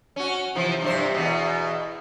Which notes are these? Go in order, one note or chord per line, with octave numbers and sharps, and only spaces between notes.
C#4 F#4
C3 E3 F3
G2 C3 C5
E2 B2